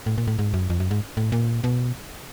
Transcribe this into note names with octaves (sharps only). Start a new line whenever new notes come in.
A2
A#2
A2
G#2
F#2
F2
F#2
G#2
A2
A#2
B2